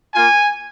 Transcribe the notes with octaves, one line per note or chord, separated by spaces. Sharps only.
A#3 F4 G#5